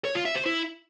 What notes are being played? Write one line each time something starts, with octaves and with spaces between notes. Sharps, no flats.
C#5
F4
E5
C5
E4